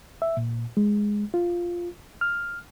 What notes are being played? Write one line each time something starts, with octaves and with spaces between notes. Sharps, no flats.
E5
A#2
G#3
F4
F6